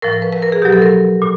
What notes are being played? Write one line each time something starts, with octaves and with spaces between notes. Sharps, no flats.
A2 F3 A#4
A#4
B4
B4
A#4
G#4
B2 F#3 G4
A4
A#4
A#2